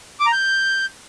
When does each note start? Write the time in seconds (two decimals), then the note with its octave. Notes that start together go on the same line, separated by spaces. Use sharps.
0.20 D6
0.26 A#5
0.32 G6